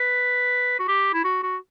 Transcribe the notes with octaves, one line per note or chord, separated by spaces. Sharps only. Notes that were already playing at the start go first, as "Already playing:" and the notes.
Already playing: B4
F#4
G4
E4
F#4
F#4